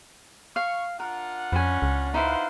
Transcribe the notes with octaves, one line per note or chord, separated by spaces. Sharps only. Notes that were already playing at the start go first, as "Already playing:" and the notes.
F5 C#6
D4 F4 A#4 F#5
F2 C#4 B4 G#5
C#2
D#4 E4 B4 C5 F5